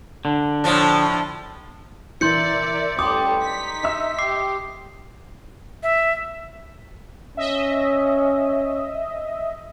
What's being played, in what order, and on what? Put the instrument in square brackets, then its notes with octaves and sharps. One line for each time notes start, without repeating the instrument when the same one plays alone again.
[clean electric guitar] D3
[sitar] A2 F3 D4
[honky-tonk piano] E3 [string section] A#4 D5 E5 [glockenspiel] C6 G6 C#7
[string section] A1 G3 A4 [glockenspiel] C6 D#6 [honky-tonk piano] D6
[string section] D#4 B6
[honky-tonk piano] D#5 E5 E6
[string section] G4 [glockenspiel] D6 C7
[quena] E5
[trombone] C#4 [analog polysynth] D#5 E5